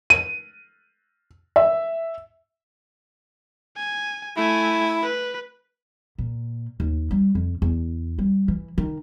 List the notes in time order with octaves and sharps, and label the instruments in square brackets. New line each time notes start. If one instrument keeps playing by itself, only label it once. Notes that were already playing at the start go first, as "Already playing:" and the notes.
[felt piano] D#7
E5
[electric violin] G#5
[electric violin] A3 G#5 [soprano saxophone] E4
[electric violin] B4
[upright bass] A#2
D#2
G3
F2
E2
G3
E3
D#3